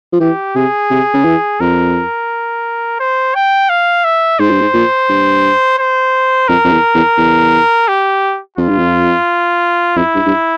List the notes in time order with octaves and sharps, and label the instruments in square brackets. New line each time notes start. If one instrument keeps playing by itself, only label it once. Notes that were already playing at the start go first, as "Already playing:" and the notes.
[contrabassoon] F3
[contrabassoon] E3 [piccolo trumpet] G4
[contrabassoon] C3 [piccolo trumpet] G#4
[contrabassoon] C3
C#3
E3
[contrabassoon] F2 [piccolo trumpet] A#4
[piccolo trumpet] C5
G5
F5
E5
[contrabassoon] G#2 [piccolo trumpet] C5
[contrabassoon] G2
G#2
A#2
G2
[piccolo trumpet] C5
[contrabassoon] F2 [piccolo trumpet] A#4
[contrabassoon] F2
E2
E2
E2
[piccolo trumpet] G4
[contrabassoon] F2 [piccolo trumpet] F4
[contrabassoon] G2
F2
[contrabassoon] F2 [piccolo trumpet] E4
[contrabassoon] G2
G2